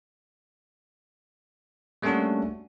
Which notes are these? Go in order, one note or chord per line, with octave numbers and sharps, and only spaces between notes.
G3 A3 A#3 C#4 D4 F#4